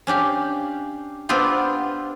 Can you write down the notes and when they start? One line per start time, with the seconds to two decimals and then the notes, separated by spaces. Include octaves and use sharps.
0.07 C#4 D4 G4 F5
1.29 B3 C4 D4 F4 G4